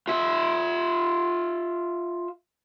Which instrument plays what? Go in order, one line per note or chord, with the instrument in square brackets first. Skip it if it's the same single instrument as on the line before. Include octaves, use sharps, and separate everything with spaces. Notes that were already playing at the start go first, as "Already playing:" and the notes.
[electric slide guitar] F4 E5